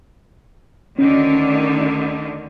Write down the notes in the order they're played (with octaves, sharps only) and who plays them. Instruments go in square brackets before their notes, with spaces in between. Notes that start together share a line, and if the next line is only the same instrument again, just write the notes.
[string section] D2 D3 D#3 [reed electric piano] C#4